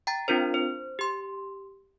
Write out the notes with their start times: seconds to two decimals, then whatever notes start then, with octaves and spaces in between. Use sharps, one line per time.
0.07 G5 A#5 A6
0.28 C4 D4 F4 A#4 C5
0.54 C5
0.99 G4 C6